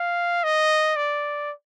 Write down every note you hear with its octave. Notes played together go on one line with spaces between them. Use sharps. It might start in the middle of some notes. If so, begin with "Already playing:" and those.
Already playing: F5
D#5
D5